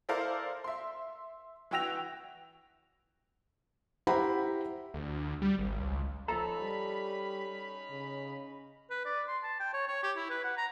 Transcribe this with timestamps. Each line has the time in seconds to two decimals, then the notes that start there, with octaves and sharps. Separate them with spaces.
0.09 E4 A4 A#4 C5 D5 F5
0.64 E5 C6
1.71 E3 F#4 G5 E6 A#6 F7
4.07 E4 G4 C5 F#5 A#5 B5
4.94 D2
5.42 G3
5.59 G#1
5.80 C#2
6.28 F3 C#4 D#4 A4 A#5 B5
6.61 G3
7.90 C#3
8.90 B4
9.05 D5
9.28 C6
9.43 A5
9.60 G5
9.73 C#5
9.87 C#5
10.03 G4
10.16 E4
10.30 B4
10.44 F#5
10.57 A#5